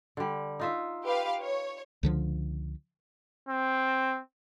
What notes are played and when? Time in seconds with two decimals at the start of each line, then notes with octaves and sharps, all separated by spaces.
0.17 D3 G3
0.60 D#4 F4 E5
1.03 G4 B4 F5
1.41 C#5
2.03 C#2 D3 F3
3.49 C4